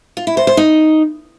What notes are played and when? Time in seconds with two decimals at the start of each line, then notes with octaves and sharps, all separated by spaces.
0.17 F4
0.27 E4
0.37 C5
0.47 C5
0.57 D#4